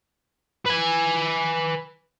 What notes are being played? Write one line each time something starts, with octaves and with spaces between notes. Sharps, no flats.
B4 G#5